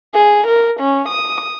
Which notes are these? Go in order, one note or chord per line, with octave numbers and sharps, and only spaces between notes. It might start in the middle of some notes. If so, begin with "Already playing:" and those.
G#4
A#4
C#4
D#6